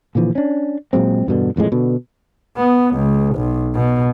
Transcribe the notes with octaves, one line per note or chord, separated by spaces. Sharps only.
A#2 D3 E3 F3
C#4 D4
A#2 F#3 G#3 C4
E2 G2 B2 D3
E1 F2 A2 G#3
B2 D3
B3
C#2
B1
B2